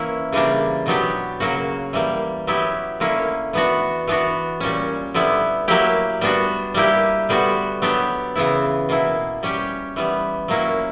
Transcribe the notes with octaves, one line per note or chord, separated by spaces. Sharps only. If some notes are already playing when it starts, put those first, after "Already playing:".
Already playing: E3 A#3 C#4 E4
C#3 E3 G3 A#3 D4
B2 F#3 B3 D4 G4
C#3 F#3 A#3 C#4 F#4
E3 G3 A#3
F#3 B3 E4 G4
D3 A#3 C#4 E4
E3 B3 D4 F#4
E3 B3 D4 F#4
A#2 G3 C#4
D3 G3 B3 E4
F#3 A#3 E4 G4
G3 B3 D4 F#4
G3 A#3 E4 G4
D3 G3 B3 F#4
F#3 B3 D4 G4
C#3 E3 B3 E4
B2 A#3 E4
G3 C#4 G4
E3 G3 B3
A#2 F#3 A#3 C#4 E4